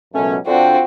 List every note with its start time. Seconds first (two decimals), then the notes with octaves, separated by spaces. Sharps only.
0.14 C#2 F#2 B2 A3 C#4
0.46 D3 C4 D4 F4 F#4 F5 G5